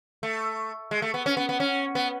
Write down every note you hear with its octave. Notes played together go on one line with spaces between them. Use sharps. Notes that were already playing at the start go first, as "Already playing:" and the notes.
A3
G#3
A3
B3
C#4
B3
B3
C#4
B3